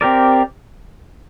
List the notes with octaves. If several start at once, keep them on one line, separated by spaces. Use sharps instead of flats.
C4 G4 A#4 D5